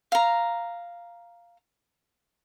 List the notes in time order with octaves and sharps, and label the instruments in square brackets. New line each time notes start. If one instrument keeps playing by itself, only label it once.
[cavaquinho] F5 A#5